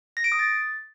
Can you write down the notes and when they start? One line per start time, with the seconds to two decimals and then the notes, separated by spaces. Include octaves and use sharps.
0.17 A#6
0.24 D7
0.32 D#6
0.39 A6